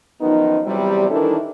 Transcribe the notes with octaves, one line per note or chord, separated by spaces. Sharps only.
F#2 D#3 F3 B3 D#4
E2 C3 F#3 G3
D#3 E3 D4 E4 A4 A#4